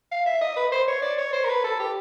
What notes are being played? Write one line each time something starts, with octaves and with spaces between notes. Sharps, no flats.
F5
E5
D#5
B4
C5
C#5
D5
C#5
C5
A#4
B4
A4
G4